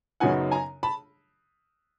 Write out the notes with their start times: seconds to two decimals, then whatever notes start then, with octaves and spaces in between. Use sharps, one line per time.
0.20 F#2 C#3 F#3 B3 D#4 F#5 G#5
0.51 G#5 A#5
0.83 A5 B5